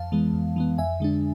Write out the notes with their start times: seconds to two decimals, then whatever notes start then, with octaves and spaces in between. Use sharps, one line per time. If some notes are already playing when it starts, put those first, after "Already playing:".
Already playing: F2 F5 A5
0.12 E3 G#3 B3
0.33 F2
0.56 E3 G#3 B3
0.78 F2 E5 G#5
1.00 D3 G#3 D4